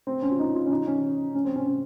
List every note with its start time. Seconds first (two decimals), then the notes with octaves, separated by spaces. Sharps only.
0.07 C4
0.22 C#4
0.31 F4
0.39 D#4
0.55 F4
0.66 C#4
0.71 D#4
0.87 C#4
1.35 C#4
1.45 C4
1.56 C#4
1.66 C#4